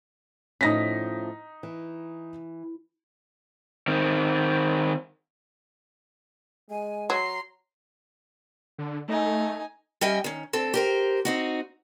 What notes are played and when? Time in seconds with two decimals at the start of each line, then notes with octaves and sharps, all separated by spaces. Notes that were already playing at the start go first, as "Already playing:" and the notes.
0.61 A2 F3 C#4 D#4 A#6 B6
1.63 E3
3.88 D#3 C4
6.70 G#3 G#5
7.10 F#3 A#5 C6
8.78 D3
9.08 A3 D#4 G#5
10.01 G3 C#4 D#5 E5 G5 G#5
10.24 D#3 C#4
10.53 D2 C4 A4
10.74 G4 A#4 C5
11.25 C4 D#4 F#4